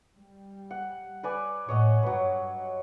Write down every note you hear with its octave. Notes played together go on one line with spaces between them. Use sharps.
G3
F#5
B4 D5 G#5
A2 C#5 D#5 F#5
G2 F#3 B4